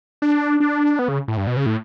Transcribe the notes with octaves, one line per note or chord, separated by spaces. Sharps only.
D4
D4
B3
C#3
A2
G2
B2
C#3
A2